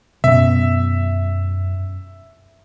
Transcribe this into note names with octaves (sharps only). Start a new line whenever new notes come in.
F#2 B2 B3 E5